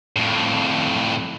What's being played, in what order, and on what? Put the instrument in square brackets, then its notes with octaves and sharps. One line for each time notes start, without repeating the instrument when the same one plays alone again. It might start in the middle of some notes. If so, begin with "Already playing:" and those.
[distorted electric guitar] F2 A2